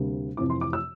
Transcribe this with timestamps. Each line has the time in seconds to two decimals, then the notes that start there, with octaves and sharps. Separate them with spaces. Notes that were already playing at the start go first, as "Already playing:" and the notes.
Already playing: D2 C3 G3 A#3
0.37 F2 C3 E3 D6
0.50 C6
0.61 D6
0.73 E6